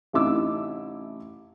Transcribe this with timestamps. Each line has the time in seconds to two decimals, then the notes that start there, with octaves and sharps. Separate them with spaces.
0.13 A1 C3 D#4 E4 D6 E6